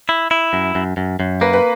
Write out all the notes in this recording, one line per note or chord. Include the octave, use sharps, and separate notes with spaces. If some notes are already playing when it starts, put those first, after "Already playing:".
E4
E4
F#2
F#2
F#2
F#2
A#3 B4
B4